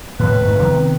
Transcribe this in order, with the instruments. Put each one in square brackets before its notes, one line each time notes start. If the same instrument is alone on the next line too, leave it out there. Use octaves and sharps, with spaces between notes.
[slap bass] A2 [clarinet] B4
[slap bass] G#2 A3
C3 D#3 B3